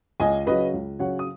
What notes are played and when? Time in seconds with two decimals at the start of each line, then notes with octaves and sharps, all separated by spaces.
0.20 C#2 D#5 G#5
0.47 C#3 F#3 B4 D#5
0.74 C#2
0.99 C#3 F#3 C#5 F#5
1.19 D#6